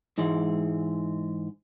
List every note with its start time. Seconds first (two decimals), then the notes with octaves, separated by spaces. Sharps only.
0.18 G#2 E3 G#3